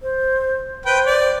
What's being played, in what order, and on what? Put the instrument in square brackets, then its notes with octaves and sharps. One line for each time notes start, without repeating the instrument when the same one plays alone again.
[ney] C5
[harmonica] B4 G5 [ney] C5
[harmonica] D5